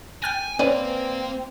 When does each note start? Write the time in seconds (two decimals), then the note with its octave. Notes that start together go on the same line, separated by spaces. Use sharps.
0.22 G5 G#5 F6 A6
0.59 A#3 C4 C#4 B4 D5 G#5